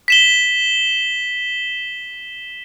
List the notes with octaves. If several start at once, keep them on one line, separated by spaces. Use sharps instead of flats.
B6 E7 G7